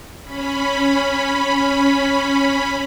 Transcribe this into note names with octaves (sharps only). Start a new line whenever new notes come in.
C#4 B5